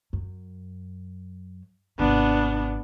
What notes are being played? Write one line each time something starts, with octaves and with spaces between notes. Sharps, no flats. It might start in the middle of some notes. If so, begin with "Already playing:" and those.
F#2
G#1 C3 B3 D4